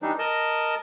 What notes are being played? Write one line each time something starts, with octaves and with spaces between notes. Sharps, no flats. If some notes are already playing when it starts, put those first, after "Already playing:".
E3 G3 D4 D#4
A#4 D#5 A5